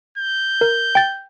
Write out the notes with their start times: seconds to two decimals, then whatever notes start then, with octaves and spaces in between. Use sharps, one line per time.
0.18 G6
0.61 A#4
0.95 G5 A6